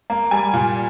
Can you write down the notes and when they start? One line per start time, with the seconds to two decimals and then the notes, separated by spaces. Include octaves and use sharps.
0.10 A#3
0.31 G3 G#5
0.53 A#2